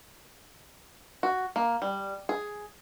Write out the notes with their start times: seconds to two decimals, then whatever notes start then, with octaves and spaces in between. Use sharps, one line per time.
1.23 F#4
1.56 A#3
1.82 G3
2.29 G#4